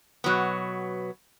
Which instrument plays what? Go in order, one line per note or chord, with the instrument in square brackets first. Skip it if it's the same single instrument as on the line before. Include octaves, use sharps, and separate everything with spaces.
[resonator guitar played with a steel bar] B2 F#3 B3